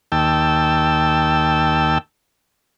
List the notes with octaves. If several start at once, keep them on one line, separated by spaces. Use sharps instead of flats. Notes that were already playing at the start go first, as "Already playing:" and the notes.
D#2 G5 A5 E6